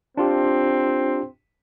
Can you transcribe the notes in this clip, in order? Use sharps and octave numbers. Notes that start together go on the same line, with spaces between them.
C4 D4 F4 G4